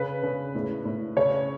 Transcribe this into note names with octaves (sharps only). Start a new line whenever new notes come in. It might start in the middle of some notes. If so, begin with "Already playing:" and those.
Already playing: C#3 B4
C#3
A2
A2
C#3 C#5